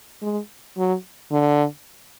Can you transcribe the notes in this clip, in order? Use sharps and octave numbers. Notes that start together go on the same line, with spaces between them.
G#3
F#3
D3